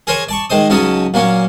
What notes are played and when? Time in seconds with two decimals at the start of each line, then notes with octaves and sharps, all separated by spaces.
0.07 G#4 A#4 C5 C#5 G#5 A#5
0.28 D5 A5 C#6
0.50 D#3 G#3 C5 D#6
0.70 C#2 F#3 C#4 D#4 A5 D#6
1.14 A#2 F#3 A#3 C#4